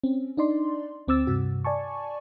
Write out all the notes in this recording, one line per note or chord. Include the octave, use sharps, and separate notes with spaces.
C4 C#4
D4 D#4 D5 C6
D2 C4 D6 E6 A6
G2 C3 F#4
D5 G#5 A5 C#6